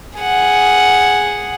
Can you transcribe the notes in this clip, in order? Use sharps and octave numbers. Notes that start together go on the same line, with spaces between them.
G#4 F#5